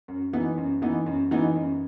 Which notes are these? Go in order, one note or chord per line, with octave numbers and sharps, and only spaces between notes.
F#2
E3 B3 D#4
F#2
E3 B3 D#4
F#2
E3 B3 D#4
F#2